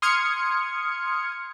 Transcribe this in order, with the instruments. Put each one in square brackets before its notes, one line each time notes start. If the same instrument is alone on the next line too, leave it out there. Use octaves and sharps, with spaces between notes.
[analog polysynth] C6 D#6 F6 G#6 C#7